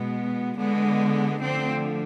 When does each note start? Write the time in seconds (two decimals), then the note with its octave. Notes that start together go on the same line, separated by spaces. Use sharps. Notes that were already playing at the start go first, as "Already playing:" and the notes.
Already playing: B2 G#3 B3
0.57 D3 G#3 B3
1.41 D3 F3 A3 C4